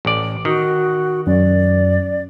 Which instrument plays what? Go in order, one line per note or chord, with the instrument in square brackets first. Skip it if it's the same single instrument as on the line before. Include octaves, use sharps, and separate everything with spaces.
[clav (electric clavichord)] A1 D5
[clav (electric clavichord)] D#3 [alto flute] F#4
[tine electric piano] F#2 [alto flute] D5